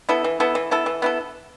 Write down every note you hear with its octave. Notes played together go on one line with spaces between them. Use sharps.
B3 E4 A4
E3
B3 E4 A4
E3
B3 E4 A4
E3
B3 E4 A4